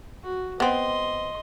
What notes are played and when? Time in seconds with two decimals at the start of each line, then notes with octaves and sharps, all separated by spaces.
0.23 F#4
0.60 B3 C4 D#5 C6